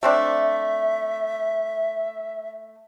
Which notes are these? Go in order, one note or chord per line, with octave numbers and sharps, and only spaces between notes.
A3 C4 D4 E5